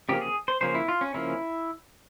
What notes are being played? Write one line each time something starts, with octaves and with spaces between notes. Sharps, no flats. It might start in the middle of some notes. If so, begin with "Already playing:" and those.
C#3 F3 A#3 C#4 G4
G#4
C5
C#3 F3 A#3 C#4 C5
E4
F4
C#4
C#3 F3 A#3 C#4 E4